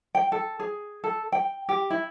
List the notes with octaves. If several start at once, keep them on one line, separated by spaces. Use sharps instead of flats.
G5
A4
G#4
A4
G5
G4
E4